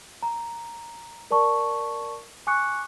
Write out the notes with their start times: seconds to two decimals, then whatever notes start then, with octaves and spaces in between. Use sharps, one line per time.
0.23 A#5
1.31 A#4 D5 A5 C#6
2.47 G#5 C#6 D6 F#6 C#7